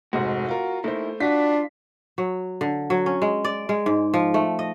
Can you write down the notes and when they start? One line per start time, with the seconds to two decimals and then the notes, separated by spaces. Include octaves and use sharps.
0.13 F1 G#2 F#4
0.49 F4 A#4
0.84 A3 A#3 D#4 E4 C5
1.20 D4 F4 F#4 B6
2.18 F#3
2.61 D3
2.90 F#3
3.06 C#4
3.22 G#3
3.45 D5
3.69 G#3
3.86 G#2
4.14 F3
4.34 A3
4.59 D#5